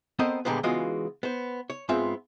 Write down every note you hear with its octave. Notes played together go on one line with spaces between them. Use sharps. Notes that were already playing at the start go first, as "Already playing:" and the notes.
B3 C4 A4 A#4 C5 D#5
A#2 D3 G3 G#3 A#3 B3
C#3 E3 G#3 B3 F4 F#4
B3 C5
C#5
G#2 G#3 B3 C4 F4 E5